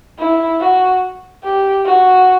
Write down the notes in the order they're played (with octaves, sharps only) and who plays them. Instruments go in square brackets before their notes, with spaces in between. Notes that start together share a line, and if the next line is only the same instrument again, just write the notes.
[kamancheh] E4
F#4
G4
F#4